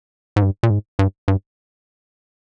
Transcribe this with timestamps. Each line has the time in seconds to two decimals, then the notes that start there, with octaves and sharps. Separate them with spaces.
0.36 G#2
0.42 G2
0.63 A#2
0.70 G#2
0.99 G2
1.28 G2